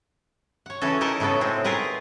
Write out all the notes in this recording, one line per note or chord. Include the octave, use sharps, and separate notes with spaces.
C#5 F#5
C#3 E3 C#4 F#4 A4
D#4 E4 A#4 D#5 A5
A2 C#3 F#3 B3 A4
A2 G#3 C4
F4 F#4 G#4 A#4 B4 F#5